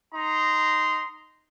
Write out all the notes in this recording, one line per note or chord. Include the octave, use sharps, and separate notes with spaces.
D#4 A#5 C6